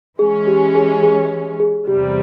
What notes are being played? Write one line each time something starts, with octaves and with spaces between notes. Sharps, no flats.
E3 G#3 C#4 G#4
G4
G#4
G#4
G#4
E2 C3 G3 G4